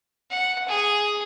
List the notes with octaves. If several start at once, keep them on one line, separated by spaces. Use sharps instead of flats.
F#5
G#4